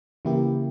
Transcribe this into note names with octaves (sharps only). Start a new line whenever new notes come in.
C#3 E3 A#3 E4 G4